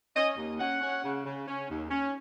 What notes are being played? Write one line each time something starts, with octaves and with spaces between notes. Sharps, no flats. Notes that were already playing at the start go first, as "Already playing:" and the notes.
C#4 D#5
D#2
C#4 F#5
C#4
C#3
C#3
C#4
D#2
C#4